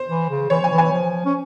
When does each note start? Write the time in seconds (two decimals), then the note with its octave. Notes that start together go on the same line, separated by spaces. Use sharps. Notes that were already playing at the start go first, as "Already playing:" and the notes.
Already playing: C5
0.08 E3
0.30 C#3
0.50 E3 C#5
0.61 F3 G#5
0.71 E3
0.78 G#5
0.92 F3
1.25 C#4